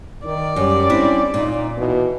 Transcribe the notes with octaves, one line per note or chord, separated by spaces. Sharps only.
D#3 D5
F#2 G3 C#4
C4 D4 E4
A#2 D#4
B2 E3